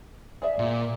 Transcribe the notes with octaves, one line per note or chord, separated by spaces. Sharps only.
G#4 D5 E5
A#2